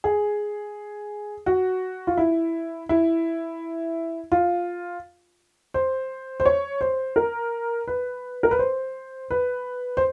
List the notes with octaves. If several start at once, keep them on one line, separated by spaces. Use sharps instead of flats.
G#4
F#4
F4
E4
E4
F4
C5
C5
C#5
C5
A#4
B4
A#4
B4
C5
B4
C5